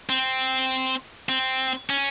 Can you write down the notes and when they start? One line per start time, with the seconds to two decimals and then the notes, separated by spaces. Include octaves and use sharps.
0.10 C4
1.29 C4
1.90 C#4